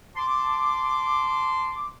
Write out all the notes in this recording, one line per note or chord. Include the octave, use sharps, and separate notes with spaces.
A5 C6 D6